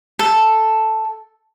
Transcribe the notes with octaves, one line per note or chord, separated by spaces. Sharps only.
A4